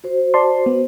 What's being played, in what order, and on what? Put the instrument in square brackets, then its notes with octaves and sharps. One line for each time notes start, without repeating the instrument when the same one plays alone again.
[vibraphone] F#4 C5
[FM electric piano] D5 A5 C6
B3